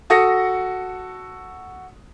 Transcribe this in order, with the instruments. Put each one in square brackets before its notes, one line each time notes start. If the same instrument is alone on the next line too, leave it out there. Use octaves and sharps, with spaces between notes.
[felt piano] F#4 A4 D#6 A#6 C#7